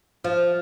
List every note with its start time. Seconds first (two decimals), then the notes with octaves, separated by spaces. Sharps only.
0.24 F3